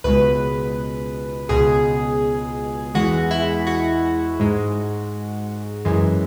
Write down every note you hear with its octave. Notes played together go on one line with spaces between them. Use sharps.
C#2 B2 G#3 B4
C#2 B2 G#3 G#4
E2 E3 G#3 F#4
E4
F#4
G#2 G#3
F#2 E3 G#3